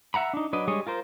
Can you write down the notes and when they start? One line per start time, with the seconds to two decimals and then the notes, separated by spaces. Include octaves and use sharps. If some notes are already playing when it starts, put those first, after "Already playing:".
0.14 E5 F#5 A#5 B5
0.33 D4 D#4
0.53 F#3 D4 B4 D#5
0.68 G3 G#3 G#4 C#5 D#5
0.87 F4 A#4 C5